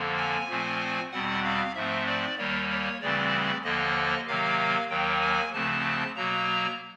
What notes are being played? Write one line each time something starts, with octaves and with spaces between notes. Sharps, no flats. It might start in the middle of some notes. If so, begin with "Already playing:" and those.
Already playing: F2 D3 F3 A#3
G#5
A#2 F3 A3 C4
E2 B2 G3 C4 F#5
F5
G#2 F3 A3 C4 E5
D5
D#2 D#3 G3 A#3 C#5
C#5
D2 C#3 E3 G3 C4 D5
D#2 D3 F3 A#3 D#5
C3 D#3 F#3 A#3 F5
D#2 D#3 F#3 A#3 G5
G#5
D2 C#3 F3 A3 C4 A5
B2 F#3 A#3 A#5